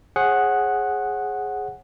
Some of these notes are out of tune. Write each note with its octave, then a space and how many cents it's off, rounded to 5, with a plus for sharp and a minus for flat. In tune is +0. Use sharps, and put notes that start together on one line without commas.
G#4 +0 C#5 -45 F#5 +0